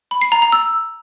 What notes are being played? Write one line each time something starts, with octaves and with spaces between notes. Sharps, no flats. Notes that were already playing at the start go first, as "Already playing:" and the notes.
B5
C7
A#5
A#5
E6